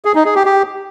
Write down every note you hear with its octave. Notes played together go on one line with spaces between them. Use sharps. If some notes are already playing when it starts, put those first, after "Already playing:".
G#4
D#4
G#4
G4
G4